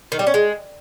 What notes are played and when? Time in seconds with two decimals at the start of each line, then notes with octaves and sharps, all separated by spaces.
0.12 D#3
0.19 G3
0.27 C#4
0.34 G#3